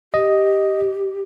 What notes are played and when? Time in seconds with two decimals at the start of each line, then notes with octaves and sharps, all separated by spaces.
0.14 G4 D#5